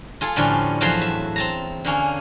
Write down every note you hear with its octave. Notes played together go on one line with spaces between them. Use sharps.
F4 G#4 A4
A2 D3 F3 G3 C#4
E2 F3 F#3 A4 E5 C6
E5
C4 A5 A#5
D3 A#3 C#4 G#4